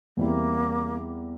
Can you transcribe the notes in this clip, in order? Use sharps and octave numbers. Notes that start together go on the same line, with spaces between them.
E2 E3 G3 A#3 C4 E4